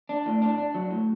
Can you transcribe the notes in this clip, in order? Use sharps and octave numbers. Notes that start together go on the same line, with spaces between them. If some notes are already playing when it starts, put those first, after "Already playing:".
D4
A2
D4
D4
F#3
A2